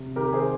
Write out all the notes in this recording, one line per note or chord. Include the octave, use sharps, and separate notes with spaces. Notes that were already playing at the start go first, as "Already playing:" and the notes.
Already playing: C3
D#2 G4 A#4
G#4 C5